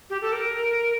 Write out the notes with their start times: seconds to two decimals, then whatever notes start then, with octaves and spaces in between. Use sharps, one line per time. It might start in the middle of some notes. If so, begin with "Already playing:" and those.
0.10 G4
0.22 A4
0.32 A#4